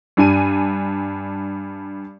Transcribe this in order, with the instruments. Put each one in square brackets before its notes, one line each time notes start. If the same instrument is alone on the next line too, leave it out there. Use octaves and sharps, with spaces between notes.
[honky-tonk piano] G2 D4 G#5 D#7